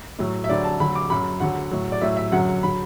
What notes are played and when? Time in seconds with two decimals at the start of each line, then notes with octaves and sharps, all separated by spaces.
0.19 A2 F#3
0.44 E5
0.49 D2 D3 F#3 D5
0.64 A5
0.80 D2 D3 F#3 B5
0.95 D6
1.10 F#2 F#3 B5
1.40 D2 D3 F#3 F#5
1.71 A2 F#3
1.92 D5
2.01 A2 F#3 E5
2.17 E5
2.32 F#2 D3 F#3 F#5
2.63 D3 F#3 B5